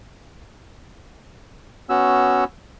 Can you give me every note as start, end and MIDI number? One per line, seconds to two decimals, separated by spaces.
1.89 2.44 59
1.89 2.44 61
1.89 2.44 66
1.89 2.44 88